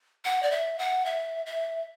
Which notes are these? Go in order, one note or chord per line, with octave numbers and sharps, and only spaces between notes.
F#5
D5
E5
F#5
E5
E5